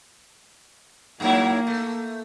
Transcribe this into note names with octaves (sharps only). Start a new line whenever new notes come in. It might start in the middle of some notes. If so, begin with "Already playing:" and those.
G2 F#3 A#3 E4
A3